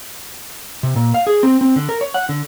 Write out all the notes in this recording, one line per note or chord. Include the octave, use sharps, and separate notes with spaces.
C3
A#2
F5
G#4
C4
C4
D3
A#4
C#5
F#5
D3